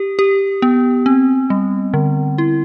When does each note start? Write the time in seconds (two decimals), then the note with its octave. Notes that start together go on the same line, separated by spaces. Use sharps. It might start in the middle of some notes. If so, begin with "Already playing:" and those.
Already playing: G4
0.19 G4
0.62 B3
1.06 C4
1.50 G3
1.94 D3
2.38 E4